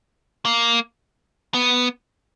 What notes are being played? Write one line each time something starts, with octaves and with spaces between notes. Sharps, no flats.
A#3
B3